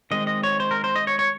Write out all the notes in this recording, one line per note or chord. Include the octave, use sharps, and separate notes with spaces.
D#3 G#3 C4 D#5
D#5
C#5
C5
A#4
C5
D#5
C#5
C#5